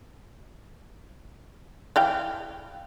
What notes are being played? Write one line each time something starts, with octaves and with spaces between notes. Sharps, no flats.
E3 F5 G5